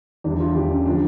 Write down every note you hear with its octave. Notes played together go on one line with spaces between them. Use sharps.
E2 E3 G3 D4
F4
E2 E3 G3 G4
C#4
D3 F3 D4